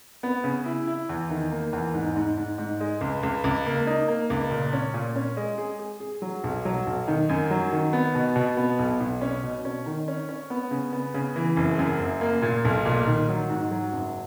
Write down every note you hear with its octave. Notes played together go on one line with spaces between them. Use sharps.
B3
C#3
E4
E4
E2
D#3
A#3
E2
G#2
G#2
G#2
G#2
G#3
C#2
C#2
C#2
A#3
D#4
A#3
C#2
A#2
C#4
A#2
C#4
G#3
G#4
G#4
G#4
F#3
B1
F#3
B1
D#3
F#2
F#3
D#3
B3
B2
B2
B3
B1
B1
C#4
B2
C#4
D#3
C#4
C#4
B3
C#3
B3
C#3
E3
F#1
F#2
F#1
A#3
A#2
B1
A#2
D#3
F#3
G#2
F#3
F#1